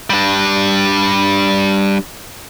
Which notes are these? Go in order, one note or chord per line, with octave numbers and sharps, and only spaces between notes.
G3 D4